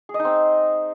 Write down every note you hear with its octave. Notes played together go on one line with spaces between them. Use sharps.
G#4
D#5
D#4
C4